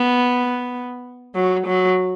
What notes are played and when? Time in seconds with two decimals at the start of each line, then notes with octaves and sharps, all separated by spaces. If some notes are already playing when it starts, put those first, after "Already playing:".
Already playing: B3
1.35 F#3
1.66 F#3